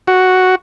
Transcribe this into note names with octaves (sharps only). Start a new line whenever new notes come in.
F#4